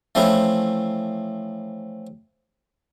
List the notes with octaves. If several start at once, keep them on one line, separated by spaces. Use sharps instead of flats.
E3 F3 A3 C4 C#4 E4